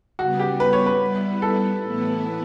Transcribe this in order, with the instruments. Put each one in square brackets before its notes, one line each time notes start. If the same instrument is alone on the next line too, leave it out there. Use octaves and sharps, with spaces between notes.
[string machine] C#3 G3 B3 [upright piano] F#4
[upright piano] G4
B4
C#5
B4
[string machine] G3 B3 E4
[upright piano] A4
[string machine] A2 E3 B3 E4